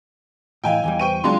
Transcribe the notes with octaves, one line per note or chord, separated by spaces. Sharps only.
A2 E3 E4 D#5 F5 G5 G#5
E2 E3 G3
B4 C5 G5 C#6 D#7
C#3 F#3 G#3 D4 F4 F5 C6